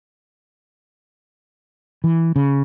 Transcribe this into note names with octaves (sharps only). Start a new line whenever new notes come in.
E3
C#3